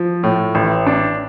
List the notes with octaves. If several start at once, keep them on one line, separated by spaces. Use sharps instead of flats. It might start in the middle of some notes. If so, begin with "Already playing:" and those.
Already playing: F3
A2
A1
D4